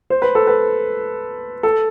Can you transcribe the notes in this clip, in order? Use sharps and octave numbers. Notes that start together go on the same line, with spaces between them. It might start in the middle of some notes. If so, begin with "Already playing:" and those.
C5
B4
A4
B4
A4